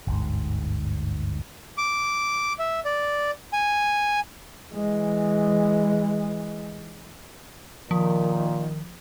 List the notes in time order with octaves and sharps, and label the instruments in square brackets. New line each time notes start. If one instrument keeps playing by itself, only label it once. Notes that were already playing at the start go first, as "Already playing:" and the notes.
[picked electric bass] G1 D2 G#2
[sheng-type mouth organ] D6
E5
D5
G#5
[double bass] E3 G#3
[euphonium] A#2 [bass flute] D#3 [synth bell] F3